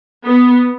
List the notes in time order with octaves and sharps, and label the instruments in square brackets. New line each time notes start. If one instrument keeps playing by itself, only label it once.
[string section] B3